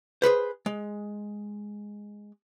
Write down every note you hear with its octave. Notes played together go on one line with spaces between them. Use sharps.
G#4 A4 B4 C5
G#3